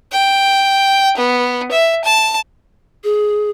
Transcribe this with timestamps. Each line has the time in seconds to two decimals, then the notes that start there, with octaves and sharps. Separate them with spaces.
0.12 G5
1.17 B3
1.71 E5
2.04 A5
3.04 G#4